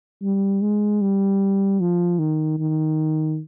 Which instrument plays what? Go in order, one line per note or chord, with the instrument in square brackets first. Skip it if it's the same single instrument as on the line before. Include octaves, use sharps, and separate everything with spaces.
[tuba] G3
G#3
G3
F3
D#3
D#3